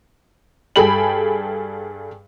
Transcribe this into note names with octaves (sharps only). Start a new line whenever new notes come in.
G2 G#4 A4 G5 B5 F#7